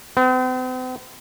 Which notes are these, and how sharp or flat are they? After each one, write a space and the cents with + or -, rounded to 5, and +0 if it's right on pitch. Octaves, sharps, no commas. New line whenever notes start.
C4 -45